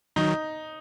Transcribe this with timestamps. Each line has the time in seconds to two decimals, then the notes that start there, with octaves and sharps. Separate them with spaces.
0.16 D#3 F#3 D#4